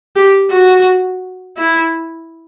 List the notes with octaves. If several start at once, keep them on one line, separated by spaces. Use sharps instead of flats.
G4
F#4
E4